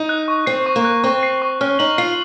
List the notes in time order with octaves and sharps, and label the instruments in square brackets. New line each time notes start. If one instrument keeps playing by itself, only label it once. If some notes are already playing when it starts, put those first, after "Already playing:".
Already playing: [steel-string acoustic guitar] D#4
[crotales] F#6
C#6
[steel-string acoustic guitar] C4 [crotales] C7
[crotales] C#6
[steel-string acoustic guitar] A#3
[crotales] F#6
[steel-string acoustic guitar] C4 [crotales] C#6
[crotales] C7
C#6
[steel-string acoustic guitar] C#4 [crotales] F6
[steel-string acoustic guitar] D#4 [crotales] F#7
[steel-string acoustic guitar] F4 [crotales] C7